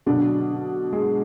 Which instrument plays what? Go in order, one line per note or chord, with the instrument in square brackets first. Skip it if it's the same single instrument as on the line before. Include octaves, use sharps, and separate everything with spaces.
[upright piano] B2 D3 F#3 D4
G#3 G#4